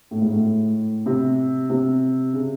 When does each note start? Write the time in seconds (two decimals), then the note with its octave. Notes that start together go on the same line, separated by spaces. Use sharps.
0.11 A2
0.21 G#2
0.32 A2
1.06 C3
1.70 C3
2.33 C#3